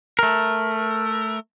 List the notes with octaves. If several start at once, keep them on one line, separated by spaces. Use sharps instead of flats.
A3 A#4